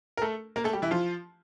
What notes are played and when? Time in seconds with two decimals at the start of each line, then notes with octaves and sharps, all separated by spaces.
0.17 A#4
0.22 A3 A4
0.56 A#3 A#4
0.64 A3 A4
0.73 G3 G4
0.82 E3 E4
0.91 F3 F4